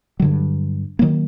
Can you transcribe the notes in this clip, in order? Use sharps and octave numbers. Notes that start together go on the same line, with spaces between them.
G2 D3 F#3
D#3 F#3 A#3